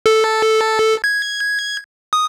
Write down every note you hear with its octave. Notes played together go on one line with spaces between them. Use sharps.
A4
G#6
D#6